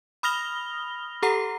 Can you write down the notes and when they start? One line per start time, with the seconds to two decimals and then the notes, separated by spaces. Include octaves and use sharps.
0.23 B5 D#6 F6 A#6 F7 G7
1.22 G4 A4 F#5 A#5 C7